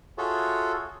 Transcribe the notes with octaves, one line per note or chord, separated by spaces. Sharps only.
F4 F#4 G#4 A4 C#5 E5